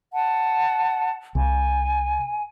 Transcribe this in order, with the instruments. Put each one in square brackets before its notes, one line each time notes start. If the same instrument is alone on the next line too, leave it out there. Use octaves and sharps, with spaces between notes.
[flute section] F#5 A5
[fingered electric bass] C2 [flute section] G#5